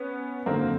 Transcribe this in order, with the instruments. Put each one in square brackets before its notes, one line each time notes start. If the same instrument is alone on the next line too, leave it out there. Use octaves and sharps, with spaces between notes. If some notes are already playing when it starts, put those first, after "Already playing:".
Already playing: [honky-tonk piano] B3 C#4
G#1 F#2 D3 A#3 C4